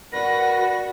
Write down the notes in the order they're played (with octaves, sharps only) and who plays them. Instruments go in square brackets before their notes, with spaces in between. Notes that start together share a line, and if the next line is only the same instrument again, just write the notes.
[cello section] F#4 [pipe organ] A#4 D5 F#5 [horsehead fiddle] B4 [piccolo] A#6